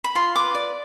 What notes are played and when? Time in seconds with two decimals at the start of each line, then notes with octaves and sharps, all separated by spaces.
0.04 B5
0.15 F4 C6
0.36 B4 D6
0.55 D5